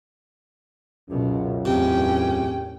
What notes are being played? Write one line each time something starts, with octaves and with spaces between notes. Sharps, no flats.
C#2 F#2 B2
E2 A2 C3 C#4 G5